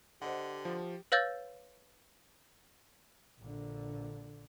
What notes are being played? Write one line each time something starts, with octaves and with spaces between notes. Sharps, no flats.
D3 G4 C5 D#5 F#5
F3
B4 C#5 F5 E6 G6 A6
A#1 D3